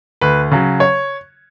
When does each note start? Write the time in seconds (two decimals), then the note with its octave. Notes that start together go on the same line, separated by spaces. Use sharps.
0.21 D2 B4
0.52 C#3 F#3
0.80 C#5